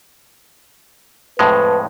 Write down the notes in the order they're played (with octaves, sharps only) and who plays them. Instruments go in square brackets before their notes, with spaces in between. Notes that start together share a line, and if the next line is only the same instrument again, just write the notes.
[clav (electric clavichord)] F2 A2 G#3 [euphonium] B4